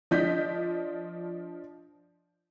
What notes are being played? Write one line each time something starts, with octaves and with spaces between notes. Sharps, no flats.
F3 D4 D#5 G6 B6